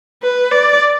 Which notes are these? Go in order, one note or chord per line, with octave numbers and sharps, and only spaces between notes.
B4
D5